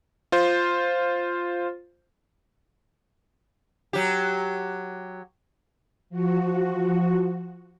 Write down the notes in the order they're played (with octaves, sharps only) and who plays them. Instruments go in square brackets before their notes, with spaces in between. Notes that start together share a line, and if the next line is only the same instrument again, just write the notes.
[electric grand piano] F4 C5
[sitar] F#3 G4
[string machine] F3 F#4